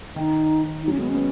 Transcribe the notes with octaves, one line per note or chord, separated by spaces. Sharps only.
D#3 D#4
D#4
F#3 C#4
G#3 B3
C#4
B3